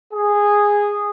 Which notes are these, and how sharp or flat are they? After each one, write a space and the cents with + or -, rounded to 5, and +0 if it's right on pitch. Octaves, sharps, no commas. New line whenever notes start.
G#4 -10